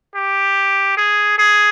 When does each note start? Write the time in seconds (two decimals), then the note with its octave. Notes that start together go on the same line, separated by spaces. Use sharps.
0.15 G4
0.97 G#4
1.38 G#4